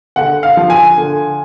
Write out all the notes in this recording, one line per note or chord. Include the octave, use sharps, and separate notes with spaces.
D3 F#5
F5
F3
G#5
D3